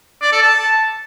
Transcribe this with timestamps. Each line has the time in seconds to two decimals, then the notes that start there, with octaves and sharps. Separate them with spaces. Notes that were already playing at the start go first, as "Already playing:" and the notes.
0.22 D5
0.32 A4
0.43 A5